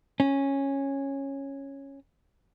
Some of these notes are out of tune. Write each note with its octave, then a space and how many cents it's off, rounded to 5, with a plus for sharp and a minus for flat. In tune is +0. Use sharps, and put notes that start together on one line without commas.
C#4 -10